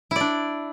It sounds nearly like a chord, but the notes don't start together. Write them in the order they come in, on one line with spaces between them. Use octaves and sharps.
E4 D5 D4